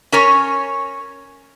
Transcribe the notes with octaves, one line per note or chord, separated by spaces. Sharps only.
C#4 A#4 C#5